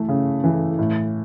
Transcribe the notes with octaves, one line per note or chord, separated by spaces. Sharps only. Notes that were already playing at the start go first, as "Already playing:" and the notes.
Already playing: E3 A3
C#3
E3
A2